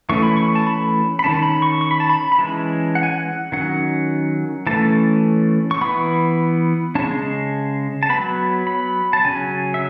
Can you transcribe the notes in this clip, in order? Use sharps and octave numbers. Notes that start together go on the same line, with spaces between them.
E3 A3 C#4 C#6
B5
C#6
A5
B5
B5
D#3 A3 C#4 A5
B5
C#6
C#6
B5
A5
B5
B5
E3 G#3 C#4 A5
F#5
G#5
F#5
D#3 F#3 C#4 F#5
E3 A3 C#4 A5
C#6
E3 B3 B5
C#3 G#3 C#4 A5
A5
F#3 B3 B5
B5
A5
C#3 F#3 C#4 G#5
E5